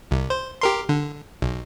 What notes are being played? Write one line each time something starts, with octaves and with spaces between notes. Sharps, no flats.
C2
C5
G4 A#4 C6
D3
B1